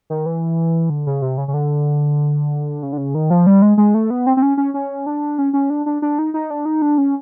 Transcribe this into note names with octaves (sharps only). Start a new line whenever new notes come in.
D#3
E3
D3
C#3
C3
C#3
C#3
D3
C#3
D3
C#3
D#3
F3
G3
G#3
G#3
A3
B3
C4
C4
C#4
C#4
C#4
D4
C#4
C#4
D4
D4
D4
D#4
D#4
D4
D#4
D4
C#4